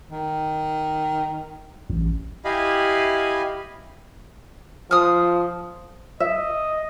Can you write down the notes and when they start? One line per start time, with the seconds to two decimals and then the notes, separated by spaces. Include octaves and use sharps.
0.11 D#3
1.90 A1
2.45 E4 G4 D#5 F5 G#5 B5
4.91 F3 D#6 F6
6.20 D#5 E5